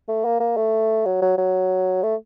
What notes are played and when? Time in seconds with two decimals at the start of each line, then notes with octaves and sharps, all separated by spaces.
0.08 A3
0.25 A#3
0.40 A#3
0.57 A3
1.05 F#3
1.22 F#3
1.38 F#3
2.03 A3